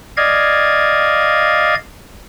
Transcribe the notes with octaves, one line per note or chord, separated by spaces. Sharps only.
D5 D#5 F5 G#6